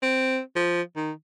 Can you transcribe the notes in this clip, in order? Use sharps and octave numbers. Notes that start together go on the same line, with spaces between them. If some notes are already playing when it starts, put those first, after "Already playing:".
C4
F3
D#3